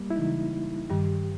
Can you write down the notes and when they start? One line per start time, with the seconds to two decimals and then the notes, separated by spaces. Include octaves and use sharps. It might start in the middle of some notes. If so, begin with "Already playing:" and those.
Already playing: G3 A#3
0.10 E4
0.16 C#3 E3 G#3 D#4
0.90 G2 D#3 G3 G4